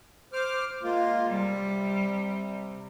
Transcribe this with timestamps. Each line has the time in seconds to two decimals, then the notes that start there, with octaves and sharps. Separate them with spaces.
0.33 C5 D6 F6
0.83 G#3 A#3 F4
1.27 C3 G3